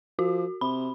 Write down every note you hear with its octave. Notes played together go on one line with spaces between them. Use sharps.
F3 F#4
C3 B5